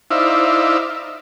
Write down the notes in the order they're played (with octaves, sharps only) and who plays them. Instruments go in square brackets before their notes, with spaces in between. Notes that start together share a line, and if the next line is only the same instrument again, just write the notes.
[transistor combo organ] D#4 E4 C5 D5 E5 F5